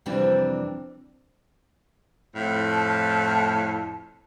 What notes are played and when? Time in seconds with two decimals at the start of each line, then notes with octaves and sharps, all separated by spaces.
0.06 F2 C3 E3 G3 C4 D4
2.35 F2 A2
2.70 A5